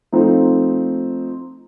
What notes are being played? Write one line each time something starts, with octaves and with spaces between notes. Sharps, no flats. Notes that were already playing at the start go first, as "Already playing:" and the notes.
F3 A3 C4 D#4